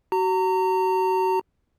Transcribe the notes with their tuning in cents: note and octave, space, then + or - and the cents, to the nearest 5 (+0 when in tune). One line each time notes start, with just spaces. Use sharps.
F#4 +30 A#5 -30